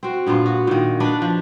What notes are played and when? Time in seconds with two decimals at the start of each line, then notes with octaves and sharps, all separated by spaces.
0.03 C4 F#4
0.27 G2 A#2 B3 F4
0.46 F#4
0.67 A#2 D#3
1.00 D4 D#4 B4 D5
1.22 F3